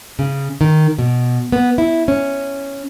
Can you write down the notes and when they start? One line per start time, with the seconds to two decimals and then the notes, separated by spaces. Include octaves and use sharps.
0.19 C#3
0.61 D#3
0.99 B2
1.52 B3
1.78 E4
2.08 C#4